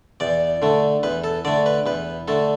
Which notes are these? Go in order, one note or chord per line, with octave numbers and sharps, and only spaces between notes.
E2 D5
D3 A3
E2 B4
A4
D3 A3 D5
B4
E2 B4
D3 A3 A4